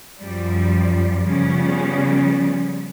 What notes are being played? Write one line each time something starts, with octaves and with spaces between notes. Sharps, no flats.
F#2 F3 G3
C#3 F3 G3 B3 C#4